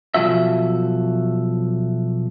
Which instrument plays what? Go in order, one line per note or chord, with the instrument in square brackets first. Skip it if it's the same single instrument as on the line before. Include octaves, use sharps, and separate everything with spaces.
[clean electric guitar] B1 F3 F#4 E5